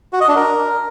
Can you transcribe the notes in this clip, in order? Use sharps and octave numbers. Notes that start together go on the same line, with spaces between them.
F#4
D#5
D4
A#4